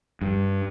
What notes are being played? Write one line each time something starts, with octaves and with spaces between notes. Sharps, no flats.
G2